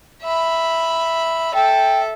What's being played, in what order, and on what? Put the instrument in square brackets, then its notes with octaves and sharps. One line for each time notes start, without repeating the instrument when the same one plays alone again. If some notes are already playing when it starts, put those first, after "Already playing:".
[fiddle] E5 B5
[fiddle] A4 E5 [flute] G5